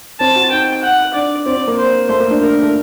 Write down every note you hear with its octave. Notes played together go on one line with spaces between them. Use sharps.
C4 A5
F#4
D#4 G5
F#5
D4 D5
C4 D5
C4
A#3
C5
A3 C5
A#3
D4
D4 A#4
A3